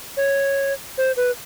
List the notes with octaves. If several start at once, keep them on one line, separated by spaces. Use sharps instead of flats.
C#5
C5
B4